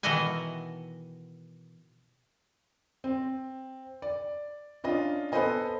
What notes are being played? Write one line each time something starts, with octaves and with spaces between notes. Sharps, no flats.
B2 D#3 E3 D#5 F#5 G#5
C4
D5
C#4 D4 F4 D#5
B3 A4 B4 C5 D#5 G#5